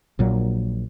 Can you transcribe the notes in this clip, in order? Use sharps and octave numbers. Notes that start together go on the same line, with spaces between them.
A#1 A#2 F#3